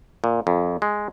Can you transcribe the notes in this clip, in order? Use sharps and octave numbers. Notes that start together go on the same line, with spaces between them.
A#2
F2
G#3